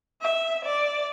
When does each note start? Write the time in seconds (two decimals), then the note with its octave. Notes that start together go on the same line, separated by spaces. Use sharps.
0.23 E5
0.65 D5